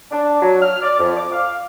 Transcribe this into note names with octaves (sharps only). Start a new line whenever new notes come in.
D4
F#3
F6
D5
F2
D6
F5